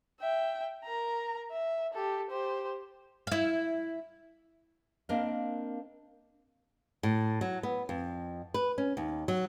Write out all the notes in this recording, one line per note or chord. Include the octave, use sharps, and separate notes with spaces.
E5 G5
A#4 A#5
E5
G4 A4
G4 C5
E4 F5
A#3 C4 D4 A#4 D#5 F5
A2
F#3
B3
F2
B4
C#4
D#2
F#3